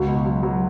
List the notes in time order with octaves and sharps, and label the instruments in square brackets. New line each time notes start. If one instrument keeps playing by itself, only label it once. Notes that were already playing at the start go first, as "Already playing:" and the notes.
Already playing: [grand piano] C#2 [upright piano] F#4
[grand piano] B2
F#3
F#3